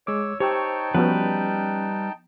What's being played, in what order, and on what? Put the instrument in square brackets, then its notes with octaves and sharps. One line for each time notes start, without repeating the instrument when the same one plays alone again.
[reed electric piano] G#3 D6 [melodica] C#5 E6
[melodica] D#4 G5 A5 [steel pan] G4 [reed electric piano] C5 C#6 E6 [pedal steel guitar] C#5
[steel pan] F3 B3 F#4 [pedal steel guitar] G3 B4 [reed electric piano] C#4